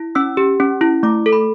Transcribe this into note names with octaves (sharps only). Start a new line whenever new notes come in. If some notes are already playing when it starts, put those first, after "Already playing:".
Already playing: E4
C#4 E6
G4
C#4
E4
A3 D6
A4
B5